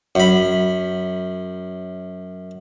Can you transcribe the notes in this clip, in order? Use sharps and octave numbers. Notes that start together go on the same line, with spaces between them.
F#2 B5